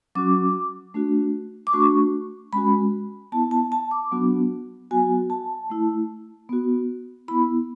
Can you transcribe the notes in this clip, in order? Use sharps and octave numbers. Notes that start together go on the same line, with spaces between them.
F#3 C#4 F#4 D6
A3 D4 F#4
D6
A3 D4 F#4 C#6
G#3 C#4 F#4 B5
B3 E4 A5
A5
A5
D6
F#3 B3 D4 F#4
F#3 B3 F#4 G#5
A5
A3 E4
B3 F#4
B3 E4 B5